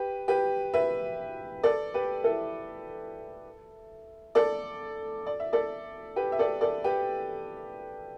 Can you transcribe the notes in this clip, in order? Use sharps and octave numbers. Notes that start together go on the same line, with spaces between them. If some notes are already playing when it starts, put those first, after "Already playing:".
Already playing: G4 B4
G4 B4
B4 E5
A4 D5
G4 B4
E4 A4
A4 D5
D5
E5
A4 D5
G4 B4
E5
A4 D5
A4 D5
G4 B4